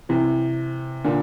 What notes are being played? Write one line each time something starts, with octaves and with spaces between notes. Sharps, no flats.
C3 E3
A#2 D3